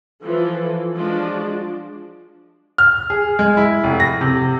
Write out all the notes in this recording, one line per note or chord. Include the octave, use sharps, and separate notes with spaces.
E3 F3 A4
F3 G#3 D4 F#4
F6
G#4
G#3
E4
F1
A#6
C3